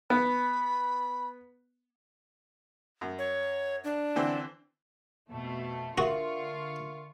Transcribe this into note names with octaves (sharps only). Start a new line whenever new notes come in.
B3 B5
F#2
C#5
D4
D3 E3 C4
F2 B2 A3
D3 F4 F#4 A#4 E5 C#6